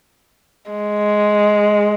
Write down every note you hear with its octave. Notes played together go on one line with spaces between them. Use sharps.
G#3